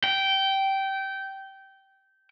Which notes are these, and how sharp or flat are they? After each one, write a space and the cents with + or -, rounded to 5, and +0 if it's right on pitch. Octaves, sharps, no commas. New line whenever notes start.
G5 -15